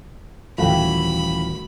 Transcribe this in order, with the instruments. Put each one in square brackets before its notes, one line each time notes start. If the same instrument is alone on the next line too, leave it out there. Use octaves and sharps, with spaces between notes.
[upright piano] D#1 F5 G5 [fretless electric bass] E3 F3 [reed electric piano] A3 F#4 [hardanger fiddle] B5